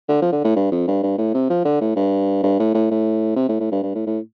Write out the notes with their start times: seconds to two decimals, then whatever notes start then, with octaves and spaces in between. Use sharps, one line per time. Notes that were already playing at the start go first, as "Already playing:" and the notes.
0.09 D3
0.22 F3
0.32 D3
0.44 A2
0.56 G2
0.72 F2
0.88 G2
1.03 G2
1.18 A2
1.34 C3
1.50 F3
1.65 D3
1.80 A2
1.96 G2
2.43 G2
2.59 A2
2.74 A2
2.91 A2
3.36 C3
3.49 A2
3.60 A2
3.72 G2
3.83 G2
3.95 A2
4.07 A2